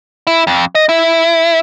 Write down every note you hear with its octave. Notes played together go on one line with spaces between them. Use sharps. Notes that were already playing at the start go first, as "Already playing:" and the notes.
E4
F2
D#5
E4